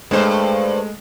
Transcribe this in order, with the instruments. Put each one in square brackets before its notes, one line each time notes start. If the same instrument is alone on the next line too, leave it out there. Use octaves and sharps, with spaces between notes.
[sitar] G2 C5 [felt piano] G#3 A3